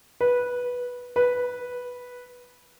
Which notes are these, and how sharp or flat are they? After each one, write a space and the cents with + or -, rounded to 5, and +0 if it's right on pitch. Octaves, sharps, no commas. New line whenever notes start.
B4 -10
B4 -5